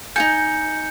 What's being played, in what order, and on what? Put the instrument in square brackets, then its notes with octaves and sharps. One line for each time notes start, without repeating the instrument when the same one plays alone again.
[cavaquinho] D#4 F#4 G#5 [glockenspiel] G6 C#7